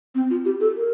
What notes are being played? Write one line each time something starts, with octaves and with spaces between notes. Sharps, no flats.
C4
F4
G4
A4
A#4